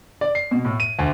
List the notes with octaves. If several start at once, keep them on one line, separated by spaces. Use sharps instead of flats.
D5
C7
B2
A2
D#7
D2